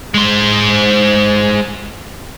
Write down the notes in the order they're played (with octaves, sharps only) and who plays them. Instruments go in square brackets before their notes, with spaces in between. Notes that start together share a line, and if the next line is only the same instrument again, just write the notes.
[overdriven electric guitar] G#3 C5